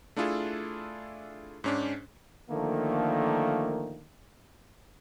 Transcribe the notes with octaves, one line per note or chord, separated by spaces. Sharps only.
A3 D4 E4 F4 G#4 A4
G#2 C#4 D4
D3 D#3 F3 A3 A#3